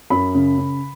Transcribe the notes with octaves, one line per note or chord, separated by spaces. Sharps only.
F#2 B5
C#3
C#3